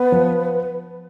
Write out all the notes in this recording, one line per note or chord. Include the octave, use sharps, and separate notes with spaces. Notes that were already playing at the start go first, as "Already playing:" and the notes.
Already playing: B3 B4
F3